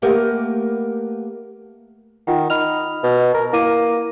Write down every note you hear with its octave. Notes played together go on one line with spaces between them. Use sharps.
A3 A#3 G4 A#4 B4 F#5
D#3 F4 F#5 G5
D#4 B5 F6 F7
B2
A#4
A#3 E4 D6 D#7